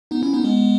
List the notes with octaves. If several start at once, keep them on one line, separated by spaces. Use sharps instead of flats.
B3 D#4
C#4 E4
B3 D#4
C#4
G#3 B3